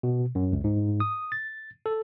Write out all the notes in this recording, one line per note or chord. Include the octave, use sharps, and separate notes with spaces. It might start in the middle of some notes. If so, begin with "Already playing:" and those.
B2
F#2
C#2
G#2
D#6
A6
A4